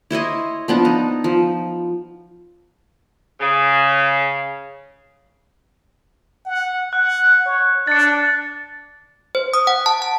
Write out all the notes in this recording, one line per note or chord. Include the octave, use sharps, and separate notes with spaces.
E4 C5 C#5 D#5
F3 B3 D4
D#4
F3
C#3
F#5
F#5 F#6
C#5
D4 A6 C#7
C5
D#6
F#5
A5
A5